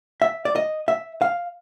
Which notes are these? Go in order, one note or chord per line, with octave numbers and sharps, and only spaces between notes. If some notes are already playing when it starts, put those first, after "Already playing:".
E5
D5
D#5
E5
F5